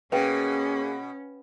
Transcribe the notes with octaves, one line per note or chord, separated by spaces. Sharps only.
B2 A#3 C#4 G#4 B4 F5 G5